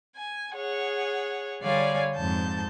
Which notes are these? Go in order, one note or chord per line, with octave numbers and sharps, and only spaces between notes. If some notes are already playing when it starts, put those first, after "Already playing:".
G#5
G#4 C#5 F#5
D3 G3 C#5 D5 F5 G#5
F2 G#2 A5 G6